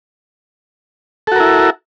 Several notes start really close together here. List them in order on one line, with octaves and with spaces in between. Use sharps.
A4 F#4 A#4 E4